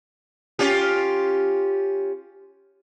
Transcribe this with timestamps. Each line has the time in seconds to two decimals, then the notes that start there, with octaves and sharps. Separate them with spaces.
0.59 C#4 F4 G4